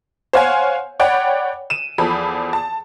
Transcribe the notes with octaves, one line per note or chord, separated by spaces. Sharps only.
C5 C#5 F5 F#5 G#5
C#5 D5 F#5 G5 B5
D#7 E7
E2 F3 A4 B5
A5